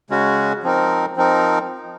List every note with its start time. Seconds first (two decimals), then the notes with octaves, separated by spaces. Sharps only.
0.10 C#3 G#3 C#4 F#4
0.63 F3 C4 D#4 A#4
1.16 F3 C4 D#4 A#4